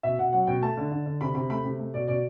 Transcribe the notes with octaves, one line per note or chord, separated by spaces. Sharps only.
B2 E5
B2 F#5
F#3 F#5
B2 G5
A3 A5
D3
D3
D3
C3 B5
C3 B5
A3 B5
C3
A3
B2 D5
B2 D5